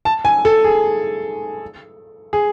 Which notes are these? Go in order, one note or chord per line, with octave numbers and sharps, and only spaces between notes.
A5
G#5
A4
G#4
G#4